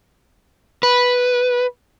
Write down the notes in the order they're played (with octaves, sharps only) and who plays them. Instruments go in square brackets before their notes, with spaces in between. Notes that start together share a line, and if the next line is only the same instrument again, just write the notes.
[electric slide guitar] B4